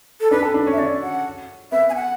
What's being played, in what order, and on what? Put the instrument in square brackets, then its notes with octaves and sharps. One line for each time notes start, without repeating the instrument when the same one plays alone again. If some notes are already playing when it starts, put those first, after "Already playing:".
[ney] A4
[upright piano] D4 [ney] B4
[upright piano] A4
D4
C#4
[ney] E5
[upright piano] C#4 [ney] D5
[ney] F#5
[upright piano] B3 [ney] E5
[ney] G#5
F#5